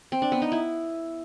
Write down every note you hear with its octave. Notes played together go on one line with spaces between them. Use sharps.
C4
D4
B3
D#4
E4